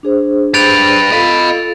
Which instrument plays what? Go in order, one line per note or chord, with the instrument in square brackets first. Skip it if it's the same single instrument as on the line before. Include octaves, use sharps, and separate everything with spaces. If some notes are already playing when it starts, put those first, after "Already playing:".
[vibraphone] D4 G#4 C5
[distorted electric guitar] G4 B4 [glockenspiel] A6 D7 F7
[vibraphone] F4 F5 [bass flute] A4 [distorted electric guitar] D#5 B5